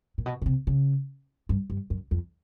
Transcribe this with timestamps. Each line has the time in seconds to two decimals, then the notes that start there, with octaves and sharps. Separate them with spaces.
0.18 A#2
0.26 B2
0.42 B2
0.46 C3
0.67 C#3
1.49 G2
1.70 G2
1.90 F#2
2.11 F2